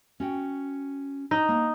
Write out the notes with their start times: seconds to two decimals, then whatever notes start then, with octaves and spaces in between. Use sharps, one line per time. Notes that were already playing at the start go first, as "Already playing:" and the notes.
0.20 C#4 F#4 G5
1.31 D#4
1.49 A#3